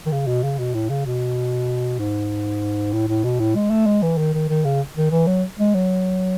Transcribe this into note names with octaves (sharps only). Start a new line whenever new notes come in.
D#3
C#3
B2
C#3
B2
A2
C#3
B2
G#2
A2
A2
B2
A2
G#3
A3
G#3
E3
D#3
D#3
D#3
C#3
D#3
E3
F#3
G#3
F#3